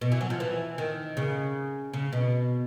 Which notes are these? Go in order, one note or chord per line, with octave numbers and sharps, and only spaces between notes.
B2
E3
F#3
F3
E3
D#3
C#3
C#3
B2